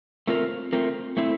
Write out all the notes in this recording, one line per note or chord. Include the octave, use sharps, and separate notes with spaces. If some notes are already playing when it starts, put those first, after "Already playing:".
A3 C4 F4 A#4
A3 C4 F4 A#4
A3 C4 E4